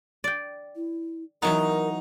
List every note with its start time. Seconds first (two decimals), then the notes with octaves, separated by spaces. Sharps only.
0.24 D5 G5
0.76 E4
1.42 E3 F#3 B3 D#4 A#4